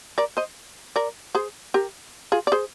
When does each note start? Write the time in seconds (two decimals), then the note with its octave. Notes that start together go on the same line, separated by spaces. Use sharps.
0.18 A#4 D5
0.37 C5 D#5
0.96 A#4 D5
1.35 G#4 C5
1.74 G4 A#4
2.32 F4 G#4
2.47 D5
2.52 G#4 C5